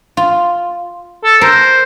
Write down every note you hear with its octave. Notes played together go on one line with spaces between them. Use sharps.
F4
A4
A#4 C5